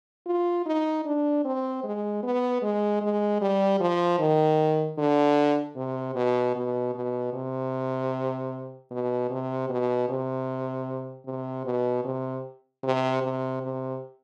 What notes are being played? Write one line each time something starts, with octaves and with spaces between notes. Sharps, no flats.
F4
D#4
D4
C4
G#3
B3
G#3
G#3
G3
F3
D#3
D3
C3
B2
B2
B2
C3
B2
C3
B2
C3
C3
B2
C3
C3
C3
C3